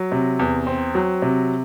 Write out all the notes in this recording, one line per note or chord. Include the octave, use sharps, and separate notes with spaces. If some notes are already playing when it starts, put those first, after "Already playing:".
Already playing: F#3
C3
E2
C4
F#3
C3